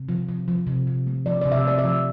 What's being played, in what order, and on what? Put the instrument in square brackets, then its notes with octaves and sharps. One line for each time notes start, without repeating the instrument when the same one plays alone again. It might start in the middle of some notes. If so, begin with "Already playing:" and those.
Already playing: [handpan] C3
F3
F3
F3
C3
C3
A3
F3 D5
C3 D5
E5
A3 D5
E5
F3